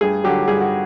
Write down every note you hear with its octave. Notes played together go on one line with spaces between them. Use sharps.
G2 G#4
D3 F#3 G4
G2 G#4
F#4